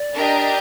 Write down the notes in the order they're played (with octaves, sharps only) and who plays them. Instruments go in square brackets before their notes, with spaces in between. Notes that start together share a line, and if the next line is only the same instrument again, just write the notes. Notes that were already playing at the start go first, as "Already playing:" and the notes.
Already playing: [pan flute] D5
[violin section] D4 G4 A#4 D#5 G5